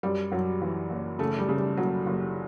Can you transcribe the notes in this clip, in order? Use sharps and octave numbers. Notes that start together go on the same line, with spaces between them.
F#2 G3
F#2 F#3
E3
F#1
C#3 A3
G3
C#3
G3
F#1 F#3
F#1